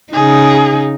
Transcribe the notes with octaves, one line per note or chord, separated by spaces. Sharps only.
C#3 D#4 G#4